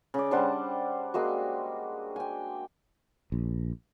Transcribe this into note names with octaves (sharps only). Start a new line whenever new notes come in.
C#3 D5
G3 D4 C5 F#5 A5
G#3 A#3 F#4
G5 G#5
A#1